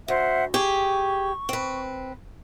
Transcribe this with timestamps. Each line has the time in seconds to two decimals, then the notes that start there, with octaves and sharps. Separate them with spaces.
0.08 D2 C5 E5 F#5
0.54 G4 G#4 C#6
1.49 C4 B4